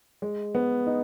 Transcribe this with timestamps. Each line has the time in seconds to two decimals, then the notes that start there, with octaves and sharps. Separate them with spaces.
0.22 G#3
0.55 B3
0.86 D#4